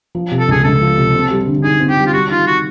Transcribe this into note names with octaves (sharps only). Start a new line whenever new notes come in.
F3
C3
A4
C#2 G#4
C#2 A4
F3
C3
C4
G3
D3
D#4 G#4
C4
G4
G3
F4
G3 F#4
D#3 F4
F#4